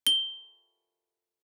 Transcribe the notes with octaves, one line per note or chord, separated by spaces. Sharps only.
G7